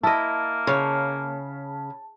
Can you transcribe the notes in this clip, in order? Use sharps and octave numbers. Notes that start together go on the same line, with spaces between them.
A#3 E4 D#5 A5
C#3 C#5